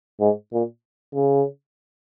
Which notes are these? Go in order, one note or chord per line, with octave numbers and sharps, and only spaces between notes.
G#2
A#2
C#3